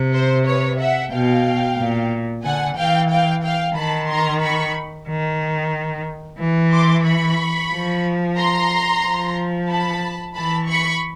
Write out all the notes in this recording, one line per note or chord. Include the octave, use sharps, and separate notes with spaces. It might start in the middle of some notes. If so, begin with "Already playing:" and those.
Already playing: C3
C5
B4 C#5
E5 F#5
B2 F5 G5
A#2
D3 F#5 G#5
E3 F5 G5
F5 G5
F5 G5
D#3 A5 B5
A#5 C6
B5 C#6
D#3
E3
C6 D6
B5 C#6
F3
A#5 C6
F3
A5 B5
E3 A5 B5
B5 C#6